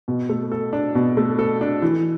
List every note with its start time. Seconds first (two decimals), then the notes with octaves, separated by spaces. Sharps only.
0.08 B2
0.29 A3
0.52 A4
0.73 D4
0.95 B2
1.17 A3
1.39 A4
1.61 D4
1.82 E3